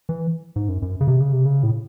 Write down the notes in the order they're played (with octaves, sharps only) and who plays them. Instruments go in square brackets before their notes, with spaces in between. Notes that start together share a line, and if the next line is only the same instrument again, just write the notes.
[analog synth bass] E3
G#2
F#2
F#2
C#3
C3
C#3
C3
C#3
A2